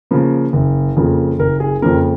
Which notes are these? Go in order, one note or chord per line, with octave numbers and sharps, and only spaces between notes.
C#3 F3 A#3
F#1
F2 C#3 F3 A#3
F#1 A#4
G#4
F2 C#3 F3 A#3 A#4